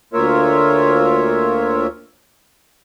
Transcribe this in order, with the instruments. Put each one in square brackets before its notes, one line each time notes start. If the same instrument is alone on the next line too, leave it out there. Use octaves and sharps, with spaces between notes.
[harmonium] D2 A#3 F4 A#4 C#5 E5